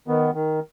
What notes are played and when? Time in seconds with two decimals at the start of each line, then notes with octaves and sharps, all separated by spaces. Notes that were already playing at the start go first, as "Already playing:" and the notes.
0.08 D#3 B3
0.34 D#3